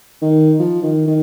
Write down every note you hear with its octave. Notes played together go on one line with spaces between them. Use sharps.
D#3
F3
D#3
D#3